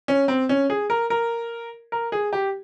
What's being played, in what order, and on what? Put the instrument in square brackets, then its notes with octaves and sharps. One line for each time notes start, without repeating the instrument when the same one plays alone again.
[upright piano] C#4
C4
C#4
G#4
A#4
A#4
A#4
G#4
G4